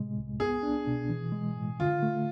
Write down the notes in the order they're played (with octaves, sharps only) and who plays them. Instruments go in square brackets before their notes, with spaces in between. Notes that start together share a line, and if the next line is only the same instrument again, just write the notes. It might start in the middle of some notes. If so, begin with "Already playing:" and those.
Already playing: [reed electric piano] A2 C3 G#3
C2
[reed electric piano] B3 [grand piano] G#4
[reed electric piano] D4
B2
E3
G#3
A2
[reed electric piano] D3 [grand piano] F4
[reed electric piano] A3